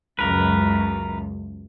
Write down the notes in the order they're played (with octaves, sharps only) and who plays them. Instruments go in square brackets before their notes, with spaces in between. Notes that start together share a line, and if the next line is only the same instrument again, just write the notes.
[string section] C#2 F#2 [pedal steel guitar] A#4 B4